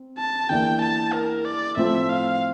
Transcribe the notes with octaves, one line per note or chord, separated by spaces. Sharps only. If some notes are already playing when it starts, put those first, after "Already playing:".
Already playing: C4
A5
E2 E3 A#3 D4 G5
A5
A#4
D5
A2 F3 C4 F4 A4 E5
F5